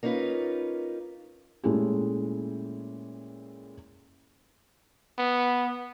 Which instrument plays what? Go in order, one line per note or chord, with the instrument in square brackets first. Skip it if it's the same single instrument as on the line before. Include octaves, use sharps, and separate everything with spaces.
[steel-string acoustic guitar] A#3 C#4 D#4 F4 B4
[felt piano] A#2 G#3 A3 C#4 E4 G4
[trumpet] B3